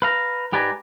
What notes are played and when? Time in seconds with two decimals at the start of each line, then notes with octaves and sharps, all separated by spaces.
0.02 B4 F5 A#5
0.52 G#2 G4 B4 D5 G#5 A#5